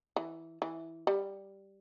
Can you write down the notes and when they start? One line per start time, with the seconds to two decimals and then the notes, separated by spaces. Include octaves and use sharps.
0.16 E3
0.62 E3
1.07 G3